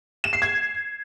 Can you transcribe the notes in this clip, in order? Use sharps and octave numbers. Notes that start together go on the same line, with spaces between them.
E7
C7
G#6